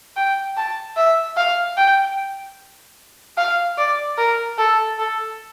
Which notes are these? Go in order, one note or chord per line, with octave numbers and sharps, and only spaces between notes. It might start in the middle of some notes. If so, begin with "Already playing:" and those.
G5
A5
E5
F5
G5
F5
D5
A#4
A4
A4